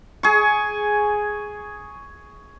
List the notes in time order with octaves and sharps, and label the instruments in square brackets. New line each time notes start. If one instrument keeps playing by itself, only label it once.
[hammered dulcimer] G#4 C#6